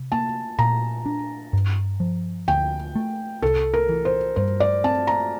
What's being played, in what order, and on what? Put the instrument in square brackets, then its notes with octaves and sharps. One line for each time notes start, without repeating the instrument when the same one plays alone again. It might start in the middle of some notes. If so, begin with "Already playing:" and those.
Already playing: [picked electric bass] C3
[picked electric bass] A#3 [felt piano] A5
[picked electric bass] A#2 [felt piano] A#5
[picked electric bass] D4
G2
F3
[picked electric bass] D2 [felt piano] G5
[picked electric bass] A3
[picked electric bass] C2 [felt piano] A4
[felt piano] A#4
[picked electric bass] E3
[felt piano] C5
[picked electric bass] G2 [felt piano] C5
[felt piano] D5
[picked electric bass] C4 [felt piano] A5
[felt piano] A#5